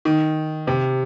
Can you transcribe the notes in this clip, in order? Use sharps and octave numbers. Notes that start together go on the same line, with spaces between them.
D#3
C3